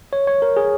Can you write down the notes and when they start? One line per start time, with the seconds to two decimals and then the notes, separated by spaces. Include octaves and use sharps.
0.13 C#5
0.27 C#5
0.42 A#4
0.57 G#4